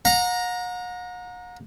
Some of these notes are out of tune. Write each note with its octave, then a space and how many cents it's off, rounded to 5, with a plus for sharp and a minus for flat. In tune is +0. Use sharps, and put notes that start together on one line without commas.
F#5 -40 A#5 +5